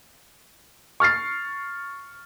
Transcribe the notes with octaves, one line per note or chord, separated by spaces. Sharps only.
C#6 F6 A6 C7